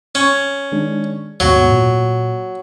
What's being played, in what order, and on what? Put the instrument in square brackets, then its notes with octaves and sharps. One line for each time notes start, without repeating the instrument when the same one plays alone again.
[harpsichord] C#4
[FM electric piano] D#3 G#3 D4
[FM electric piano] D#2 G#2 B2 [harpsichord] F#3
[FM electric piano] A#2